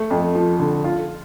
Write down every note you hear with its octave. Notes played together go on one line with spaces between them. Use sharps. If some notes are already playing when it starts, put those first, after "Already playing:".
Already playing: A3
F2
F3
D3
F4